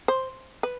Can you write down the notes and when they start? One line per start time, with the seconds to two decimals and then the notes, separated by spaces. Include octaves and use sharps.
0.08 C5
0.63 B4